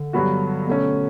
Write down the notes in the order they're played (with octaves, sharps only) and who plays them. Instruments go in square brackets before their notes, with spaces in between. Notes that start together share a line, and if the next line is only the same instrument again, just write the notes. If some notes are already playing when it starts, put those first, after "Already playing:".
Already playing: [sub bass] D3
[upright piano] G2 F#3 B3 F#4
B2 A3 C#4